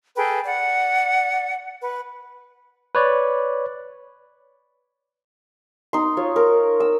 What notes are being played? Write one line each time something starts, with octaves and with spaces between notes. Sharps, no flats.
G#4 A4 B4 G5
D5 F#5
B4
B4 C#5 D5
D#4 C6
F4 C#5
A#4
E6